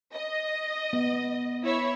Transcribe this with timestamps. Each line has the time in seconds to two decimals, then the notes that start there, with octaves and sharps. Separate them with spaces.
0.13 D#5
0.93 B3
1.64 E4 C#5 E5